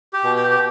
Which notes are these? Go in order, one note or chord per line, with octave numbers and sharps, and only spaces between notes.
G4
B2
G4
G4